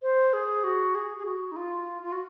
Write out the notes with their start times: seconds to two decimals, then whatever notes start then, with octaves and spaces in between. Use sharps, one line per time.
0.02 C5
0.33 G#4
0.64 F#4
0.95 G#4
1.18 G#4
1.25 F#4
1.52 D#4
1.56 F4
2.02 F4
2.12 F#4